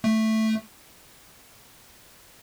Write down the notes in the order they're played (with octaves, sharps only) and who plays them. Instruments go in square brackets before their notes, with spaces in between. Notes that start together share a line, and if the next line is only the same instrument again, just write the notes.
[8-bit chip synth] A3